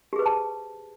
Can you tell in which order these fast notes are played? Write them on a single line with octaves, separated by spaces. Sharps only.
G4 G#4 B4 C5 A5